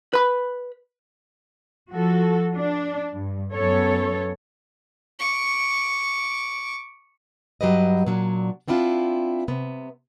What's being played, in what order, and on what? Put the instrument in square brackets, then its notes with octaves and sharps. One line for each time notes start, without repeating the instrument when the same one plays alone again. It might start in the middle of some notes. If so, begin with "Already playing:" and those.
[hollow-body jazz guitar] B4 B5
[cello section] F3 F#4 A4
D4
G2
F#2 B3 A4 C#5
[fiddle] C#6 D6
[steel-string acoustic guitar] G2 F#3 G4 B4 D#5
A#2 F#3 D4
B3 C4 D4 E4 F4
C3 B3